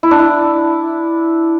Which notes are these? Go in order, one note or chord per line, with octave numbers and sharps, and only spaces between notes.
E4
D4
E4